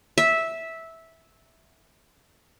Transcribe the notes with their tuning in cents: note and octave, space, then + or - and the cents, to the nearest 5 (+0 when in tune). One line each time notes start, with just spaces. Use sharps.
E5 -10